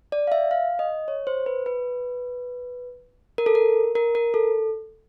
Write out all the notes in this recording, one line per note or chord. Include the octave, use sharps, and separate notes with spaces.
D5
F5
E5
F5
D#5
C#5
C5
B4
B4
A#4
A4
A#4
A#4
A#4
A4